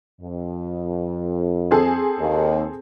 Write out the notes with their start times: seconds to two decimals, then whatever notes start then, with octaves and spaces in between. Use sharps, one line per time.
0.21 F2
1.71 C4 G#4 A4
2.19 D#2